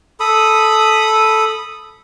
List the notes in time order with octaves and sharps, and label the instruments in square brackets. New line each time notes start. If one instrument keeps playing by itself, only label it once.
[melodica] A4 B5 D#6